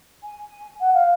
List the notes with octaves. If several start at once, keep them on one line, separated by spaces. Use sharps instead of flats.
G#5
F#5
F5